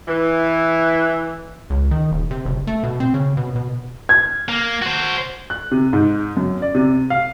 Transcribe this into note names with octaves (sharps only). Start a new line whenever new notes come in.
E3
C#2
D#3
D#1
C3
F#1
A3
B2
C4
C#3
B2
B2
G#6
A#3
F#4 C5
F#6
C3
G#2
F#2
D5
C3
F5